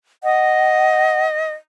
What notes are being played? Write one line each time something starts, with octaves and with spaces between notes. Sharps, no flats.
D#5 F#5